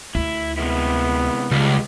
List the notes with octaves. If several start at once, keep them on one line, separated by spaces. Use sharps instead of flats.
D2 E4
C3 G#3 B3 E4
C#2 G3 G#3